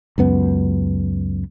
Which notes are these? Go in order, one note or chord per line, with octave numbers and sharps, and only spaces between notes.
C#2 F#2 B3